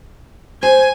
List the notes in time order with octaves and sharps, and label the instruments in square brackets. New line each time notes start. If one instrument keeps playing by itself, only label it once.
[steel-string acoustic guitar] C5 [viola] G#5